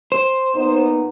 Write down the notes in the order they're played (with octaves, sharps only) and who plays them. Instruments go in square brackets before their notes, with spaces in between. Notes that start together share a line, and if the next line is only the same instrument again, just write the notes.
[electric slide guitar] C5
[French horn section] A#2 B3 D#4